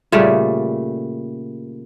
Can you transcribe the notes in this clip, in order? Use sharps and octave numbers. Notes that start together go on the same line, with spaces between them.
A#2 C#3 G3 A3